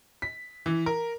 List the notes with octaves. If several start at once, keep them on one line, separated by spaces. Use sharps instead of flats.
B6
E3
A#4